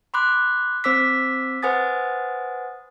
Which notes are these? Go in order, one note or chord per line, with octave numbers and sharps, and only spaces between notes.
B5 C6 D6 F#6
C4 C5 D6 E6 B6
B4 C5 F#5 G#5 D#6 A6